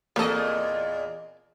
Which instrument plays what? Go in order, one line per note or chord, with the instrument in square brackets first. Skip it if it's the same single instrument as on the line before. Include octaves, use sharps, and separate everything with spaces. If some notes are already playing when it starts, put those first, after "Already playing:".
[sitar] E2 A#2 D#5 [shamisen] A#3 C4 A4